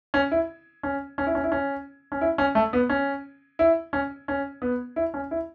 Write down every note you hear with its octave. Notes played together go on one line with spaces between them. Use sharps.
C#4
E4
C#4
C#4
E4
C#4
E4
C#4
C#4
E4
C#4
A3
B3
C#4
E4
C#4
C#4
B3
E4
C#4
E4